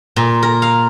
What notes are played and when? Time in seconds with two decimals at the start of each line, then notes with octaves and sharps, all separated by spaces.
0.16 A#2
0.42 A#4
0.62 F5